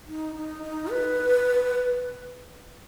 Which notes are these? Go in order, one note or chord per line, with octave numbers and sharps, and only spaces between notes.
D#4
D#4
D#4
B4